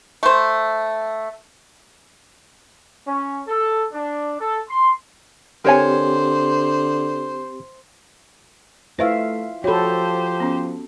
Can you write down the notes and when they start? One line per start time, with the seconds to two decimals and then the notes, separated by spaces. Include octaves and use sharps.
0.23 A3 C5
3.06 C#4
3.48 A4
3.92 D4
4.39 A4
4.68 C6
5.65 D3 C4 G4 A#4 C5 C#5 G#5
8.99 A3 E4 F4 B4 C5 E5 F5
9.64 F3 F#4 G4 A4 C5 C#5 B5
10.40 B3 C#4